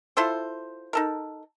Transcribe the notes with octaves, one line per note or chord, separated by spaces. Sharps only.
E4 F4 A4 C5
D#4 A4 A#4